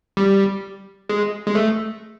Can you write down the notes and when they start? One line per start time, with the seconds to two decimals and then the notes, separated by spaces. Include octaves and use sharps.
0.17 G3
1.09 G#3
1.47 G#3
1.55 A3